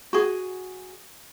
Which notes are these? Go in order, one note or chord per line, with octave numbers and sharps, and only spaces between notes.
F#4 G#4